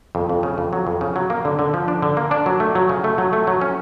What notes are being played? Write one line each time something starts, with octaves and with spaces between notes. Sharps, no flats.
F2
F2
C#3
F2
F#3
F2
C#3
F#3
A#3
D3
D3
F3
D4
D3
A#3
D4
F#3
A3
F#3
C#3
A3
F#3
A3
F#3
C#4